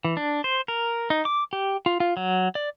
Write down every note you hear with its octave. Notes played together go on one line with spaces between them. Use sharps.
E3
D4
C5
A#4
D#4
D6
G4
F4
F4
F#3
D5